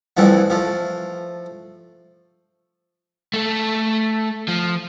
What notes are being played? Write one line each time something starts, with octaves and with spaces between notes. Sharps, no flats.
C2 F2 E3 F3 A3
F3 A3
A3 A4
F3